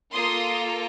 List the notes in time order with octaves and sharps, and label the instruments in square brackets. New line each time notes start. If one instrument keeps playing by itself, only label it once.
[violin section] A#3 F4 A4 C6 D#6